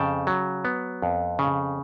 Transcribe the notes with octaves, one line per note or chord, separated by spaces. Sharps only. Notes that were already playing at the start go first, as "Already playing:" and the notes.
Already playing: F2 C#3 G5 A5
F#3
B3
F2
C#3